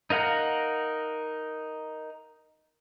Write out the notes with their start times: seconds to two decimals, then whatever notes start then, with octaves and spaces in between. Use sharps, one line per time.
0.10 D#4 A#4 F5 F#5 A#5